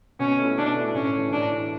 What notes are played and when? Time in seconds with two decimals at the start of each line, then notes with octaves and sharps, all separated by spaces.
0.19 B2 C#4
0.39 A3 E4
0.58 B2 D4
0.76 A3 E4
0.94 A2 C#4
1.14 E3 A3
1.32 A2 D4
1.51 E3 A3